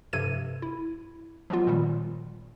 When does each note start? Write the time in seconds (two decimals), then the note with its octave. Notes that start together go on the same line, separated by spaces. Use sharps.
0.13 G2 C3 F3 A4 G#6 D#7
0.62 E4
1.50 F3 F#3 G#3 B3 F4
1.67 A#2 D#3 G3